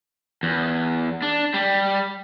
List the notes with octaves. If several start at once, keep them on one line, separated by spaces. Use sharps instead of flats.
E2
D4
G3